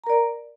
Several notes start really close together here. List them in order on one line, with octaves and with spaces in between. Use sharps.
A#5 A#4 D5